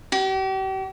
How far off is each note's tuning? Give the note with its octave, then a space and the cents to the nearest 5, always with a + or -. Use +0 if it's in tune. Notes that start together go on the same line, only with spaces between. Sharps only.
G4 -40